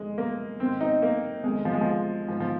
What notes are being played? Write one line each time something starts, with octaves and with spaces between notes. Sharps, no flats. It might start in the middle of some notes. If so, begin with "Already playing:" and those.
Already playing: F2 C3 D#3 G#3
A#3
G#2 D#3 C4
D#4
A#3
F2 D#3 G#3
F3
G#3
F3
G#2 D#3 F3
F3